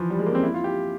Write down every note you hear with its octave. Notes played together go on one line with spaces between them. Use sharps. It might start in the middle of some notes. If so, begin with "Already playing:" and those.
Already playing: E3 F3
G3
G#3
A#3
C#4
C4
E4
F4
G4